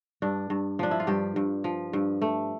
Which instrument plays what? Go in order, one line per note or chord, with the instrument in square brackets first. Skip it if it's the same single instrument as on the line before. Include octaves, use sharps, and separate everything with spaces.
[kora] G2 D4
G2
F3 D4
E4
F4
G2 G4
G2
F3
G2
A3